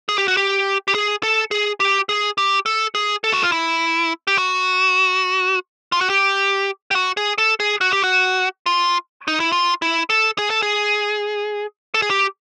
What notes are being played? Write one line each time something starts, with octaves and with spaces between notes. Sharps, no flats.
G#4
G4
F#4
G4
G4
G#4
A4
G#4
G4
G#4
G4
A4
G#4
A4
F#4
F4
E4
G4
F#4
F4
F#4
G4
G4
F#4
G#4
A4
G#4
F#4
G4
F#4
F4
D#4
E4
F4
E4
A4
G#4
A4
G#4
A4
G#4
G4